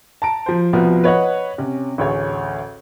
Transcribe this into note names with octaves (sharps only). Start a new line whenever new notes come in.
A5 A#5 D7
F3 C5
C2 B2 F3 B3
B4 C#5 D#5 F#5
C3 C#4
A1 D2 G#4 C#5